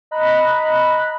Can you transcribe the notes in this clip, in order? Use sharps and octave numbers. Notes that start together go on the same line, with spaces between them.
D#5 A#5 B5 F#6